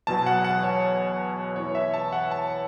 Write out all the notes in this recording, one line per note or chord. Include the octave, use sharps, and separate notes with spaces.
E2 B2 F#3 A5
F#5
F#5
C#5
E2 E3 C#5
E5
A5
F#5
A5